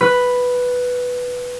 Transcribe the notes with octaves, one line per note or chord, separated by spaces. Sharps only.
B4